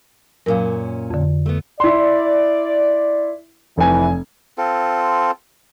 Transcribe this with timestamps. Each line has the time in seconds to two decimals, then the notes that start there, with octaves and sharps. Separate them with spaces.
0.46 F#2 A#2 C#4 A#4 F5
1.11 F2 D3
1.46 A3 B3
1.80 E4 D5 C6
3.78 F1 E3 G#5
4.58 C4 F4 A4